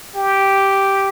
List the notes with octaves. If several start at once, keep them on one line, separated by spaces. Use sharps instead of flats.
G4